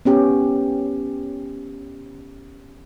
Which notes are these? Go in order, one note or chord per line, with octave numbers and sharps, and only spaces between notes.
B3 C#4 G4